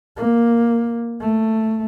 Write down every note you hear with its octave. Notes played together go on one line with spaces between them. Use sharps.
A#3
A3